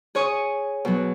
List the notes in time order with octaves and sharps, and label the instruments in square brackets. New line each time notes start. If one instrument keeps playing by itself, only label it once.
[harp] G#4 C#5 C#6 D#6
B2 F#3